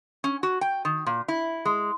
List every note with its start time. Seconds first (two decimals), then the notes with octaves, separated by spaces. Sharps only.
0.24 C#4
0.43 F#4
0.61 G5
0.85 D#3
1.06 A#2
1.28 E4
1.65 G#3